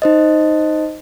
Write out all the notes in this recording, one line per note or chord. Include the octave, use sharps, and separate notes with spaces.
D#4 C5 D#5